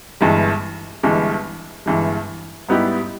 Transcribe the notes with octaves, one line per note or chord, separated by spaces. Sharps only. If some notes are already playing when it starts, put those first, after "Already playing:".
G1 G2 E3 G#3
G1 G2 E3 G#3
G1 G2 E3 G#3
G#2 G3 B3 E4 G4